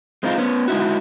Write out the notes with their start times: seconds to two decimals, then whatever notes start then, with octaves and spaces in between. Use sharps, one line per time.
0.23 G#3 C4 D#4 F4
0.38 B3 C#4
0.68 G#3 D#4 E4 F#4